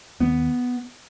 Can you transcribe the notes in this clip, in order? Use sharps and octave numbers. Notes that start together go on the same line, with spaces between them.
D#2 B3